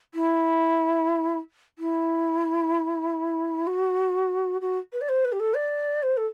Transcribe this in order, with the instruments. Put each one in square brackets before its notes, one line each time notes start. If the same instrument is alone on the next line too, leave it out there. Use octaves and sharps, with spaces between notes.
[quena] E4
E4
F#4
F#4
B4
D5
C5
B4
G4
A4
D5
C5
A4